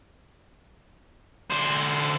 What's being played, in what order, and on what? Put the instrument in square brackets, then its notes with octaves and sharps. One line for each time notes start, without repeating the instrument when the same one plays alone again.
[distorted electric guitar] D3 C5